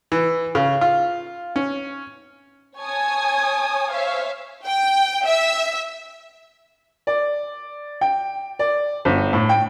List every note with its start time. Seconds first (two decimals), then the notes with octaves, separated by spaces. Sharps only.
0.12 E3
0.55 C#3
0.81 F4
1.56 C#4
2.78 C#5 G#5 A5 D#6 G#6
3.90 C5 C#5 E5 F5
4.66 G5
5.25 E5
7.07 D5
8.01 G5
8.59 D5
9.05 G1
9.33 A2
9.49 G5